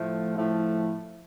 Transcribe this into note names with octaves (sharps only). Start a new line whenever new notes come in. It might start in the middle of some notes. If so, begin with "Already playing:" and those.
Already playing: A2 F3 A3
A2 F3 A3